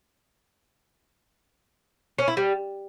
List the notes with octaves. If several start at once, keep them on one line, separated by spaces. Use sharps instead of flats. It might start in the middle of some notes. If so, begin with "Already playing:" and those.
C#4
E4
G3